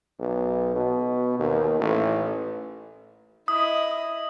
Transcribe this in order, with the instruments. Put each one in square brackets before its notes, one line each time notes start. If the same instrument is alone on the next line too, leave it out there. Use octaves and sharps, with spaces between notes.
[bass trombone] B1
B2
D#2
A1
[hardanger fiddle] E4 D#5 [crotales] D#6